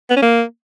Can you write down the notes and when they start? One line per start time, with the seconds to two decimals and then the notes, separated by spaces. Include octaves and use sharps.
0.10 B3
0.16 C#4
0.22 A#3